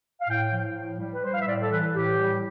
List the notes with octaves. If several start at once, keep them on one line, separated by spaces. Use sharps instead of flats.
F5
A2 G5
F3
A2
G3
B4
G3 C5
F5
E5
A2 D5
A4
E3 B4
A2 G4
G3